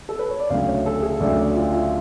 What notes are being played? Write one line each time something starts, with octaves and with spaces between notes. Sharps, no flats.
A4
B4
C#5
D5
D2 C#3 F#3 A3 F5
C#5
A4
G#4
D2 C#3 F#3 A3 D5
D5
F4
F4